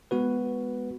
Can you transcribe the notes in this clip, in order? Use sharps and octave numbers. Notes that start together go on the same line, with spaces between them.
G#3 B3 F#4 B4